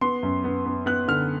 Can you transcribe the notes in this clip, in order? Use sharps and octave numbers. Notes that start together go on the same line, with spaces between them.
B3 C6
F#2
B3
B3
B3 F#6
D3 F6